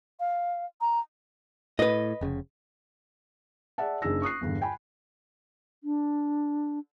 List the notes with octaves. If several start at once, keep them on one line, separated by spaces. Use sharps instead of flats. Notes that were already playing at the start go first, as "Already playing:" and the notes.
F5
A#5
A2 B4 D#5
F1 C#3
G#4 D5 E5 F#5 A5
F#1 D4 D#4 G#4 E6 A#6
C#6 D#6 F#6 C7
E2 G2 D3
G5 G#5 B5
D4